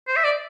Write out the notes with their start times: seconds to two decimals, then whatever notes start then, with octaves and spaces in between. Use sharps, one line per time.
0.08 C5
0.16 E5
0.24 D5